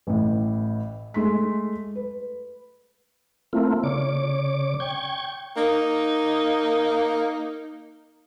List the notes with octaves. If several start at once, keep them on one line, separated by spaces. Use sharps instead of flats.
A1 A2
G#3 A3 C6 B6
B4
A3 A#3 C4 E4 F4
C#3 C#5 D5 D6
G5 C#6 G#6
A#3 D#4